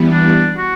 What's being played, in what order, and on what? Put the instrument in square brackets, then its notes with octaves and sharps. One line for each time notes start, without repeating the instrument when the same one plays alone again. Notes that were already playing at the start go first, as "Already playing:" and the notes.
Already playing: [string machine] E3 G3 B3
[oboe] D4
F#4